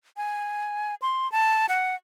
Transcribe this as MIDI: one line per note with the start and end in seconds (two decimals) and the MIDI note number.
0.17 0.95 80
1.02 1.30 84
1.32 1.66 81
1.69 1.95 78